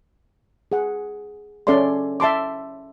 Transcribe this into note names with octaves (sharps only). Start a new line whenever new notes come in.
G#4 F#5
C#4 A4 D5 E5 C6
E5 A5 C6 D6